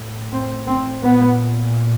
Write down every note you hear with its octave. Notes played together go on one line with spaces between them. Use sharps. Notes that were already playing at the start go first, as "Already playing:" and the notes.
Already playing: A2
C4
C4
A#2 B3